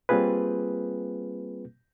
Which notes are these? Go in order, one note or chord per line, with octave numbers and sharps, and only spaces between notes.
G3 A#3 C4 F4 G#4 B4